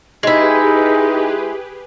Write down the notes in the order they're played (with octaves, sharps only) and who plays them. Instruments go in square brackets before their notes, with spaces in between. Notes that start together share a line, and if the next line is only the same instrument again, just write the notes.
[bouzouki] G#3 E4 [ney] D#4 [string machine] G4 G#4 B4